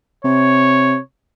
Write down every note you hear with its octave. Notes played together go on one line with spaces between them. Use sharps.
C3 C#5